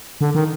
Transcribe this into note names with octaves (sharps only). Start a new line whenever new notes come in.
D3
D#3